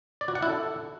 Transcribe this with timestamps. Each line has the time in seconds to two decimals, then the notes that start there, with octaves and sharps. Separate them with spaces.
0.21 D5
0.28 F#4
0.35 F#5
0.43 E4
0.50 A4